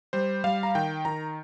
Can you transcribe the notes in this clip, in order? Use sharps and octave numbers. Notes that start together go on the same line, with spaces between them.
G3 C5
G3 F5
A#5
D#3 G5
D#3 A#5